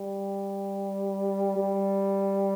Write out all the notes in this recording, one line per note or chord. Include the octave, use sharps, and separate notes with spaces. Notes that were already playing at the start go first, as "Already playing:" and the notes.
Already playing: G3
G3